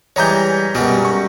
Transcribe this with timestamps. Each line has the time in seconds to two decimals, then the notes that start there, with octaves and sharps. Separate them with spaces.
0.16 E3 G3 G#3 C#5 A#5 G6
0.75 F#2 B2 G3 G#3
1.05 C#6